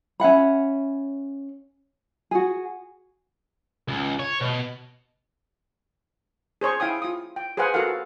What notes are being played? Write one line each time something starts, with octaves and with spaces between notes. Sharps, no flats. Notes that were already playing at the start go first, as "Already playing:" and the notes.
C#4 E5 F#5 B5
F#4 G#4
C#2
C#5
B2
G#4 C5 C#5 C#6
E4 F5 G5 G#5 D#6
F4 D#6
G5
G#4 B4 C5 F5 F#5 G#5
F#4 A4 A#4 F5 F#5